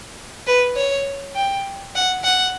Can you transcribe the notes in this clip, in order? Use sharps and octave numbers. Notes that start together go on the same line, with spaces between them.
B4
C#5
G5
F#5
F#5